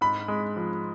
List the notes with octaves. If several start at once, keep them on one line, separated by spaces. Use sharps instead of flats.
G#2 B5
G#3
F3